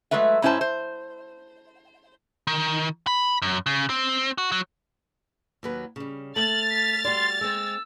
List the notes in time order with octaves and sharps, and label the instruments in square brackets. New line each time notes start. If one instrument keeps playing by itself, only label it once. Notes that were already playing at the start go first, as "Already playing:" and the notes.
[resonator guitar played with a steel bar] F#3 G#3 A3 B4 E5
G#2 C#4 E4 G4 C5 A5
C5
[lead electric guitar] D#3
B5
F#2
C#3
C4
F#4
F#3
[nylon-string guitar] D#2 F#3 B4
C#3 G3
[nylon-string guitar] A3 [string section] F6 A6 [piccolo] F#7
[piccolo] B6
[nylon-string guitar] G3 F#4 D5 [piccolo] C6
[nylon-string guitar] G#3 C4 [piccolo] E6